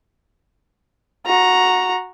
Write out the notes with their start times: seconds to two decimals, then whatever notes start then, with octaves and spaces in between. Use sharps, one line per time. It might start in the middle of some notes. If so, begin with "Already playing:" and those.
1.26 F#4 A#5